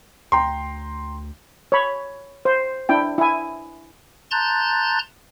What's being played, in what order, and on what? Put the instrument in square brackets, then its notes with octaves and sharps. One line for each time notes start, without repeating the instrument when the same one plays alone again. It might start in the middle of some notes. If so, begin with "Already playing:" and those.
[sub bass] D2 [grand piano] G5 A#5 C6
[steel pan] C#5 B5
C5
D4 E4 G5
E4 G#5
[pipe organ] A5 A#5 C6 F#6 G6 A6